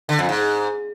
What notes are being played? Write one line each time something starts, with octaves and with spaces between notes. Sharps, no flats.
D3
F2
G#2